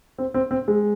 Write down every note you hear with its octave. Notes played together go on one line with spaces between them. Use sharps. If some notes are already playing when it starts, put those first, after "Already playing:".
C4
C4
C4
G#3